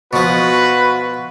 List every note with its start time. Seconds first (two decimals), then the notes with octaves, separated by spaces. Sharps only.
0.13 B2 F3 F#4 B4